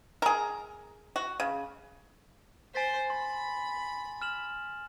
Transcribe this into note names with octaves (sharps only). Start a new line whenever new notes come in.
G#4 A#4
F#4
C#3
C5 G#5 A6 B6
B5 C6
F6 E7 F#7